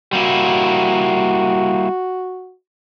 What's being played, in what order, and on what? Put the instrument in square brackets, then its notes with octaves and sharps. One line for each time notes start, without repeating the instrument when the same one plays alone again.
[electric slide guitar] G3 A#3 E4 [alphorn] F#4